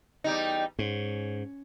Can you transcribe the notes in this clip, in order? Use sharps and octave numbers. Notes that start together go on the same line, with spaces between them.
E2 G3 D#4
G#2 C#4